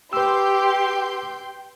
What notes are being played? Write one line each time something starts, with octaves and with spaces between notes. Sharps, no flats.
G4 B4 G5 C6 E6 G6